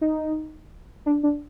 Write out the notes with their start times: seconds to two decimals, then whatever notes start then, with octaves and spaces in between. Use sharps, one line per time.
0.01 D#4
1.06 D4
1.23 D4